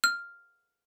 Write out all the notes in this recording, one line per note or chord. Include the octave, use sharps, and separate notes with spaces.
F6